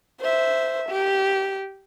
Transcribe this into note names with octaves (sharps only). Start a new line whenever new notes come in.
C5 E5
G4